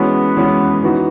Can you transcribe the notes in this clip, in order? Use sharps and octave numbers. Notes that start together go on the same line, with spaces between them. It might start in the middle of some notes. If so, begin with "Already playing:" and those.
Already playing: E3 G#3 B3 C#4 F#4
E3 G#3 C#4 F#4
E3 B3 D#4 F#4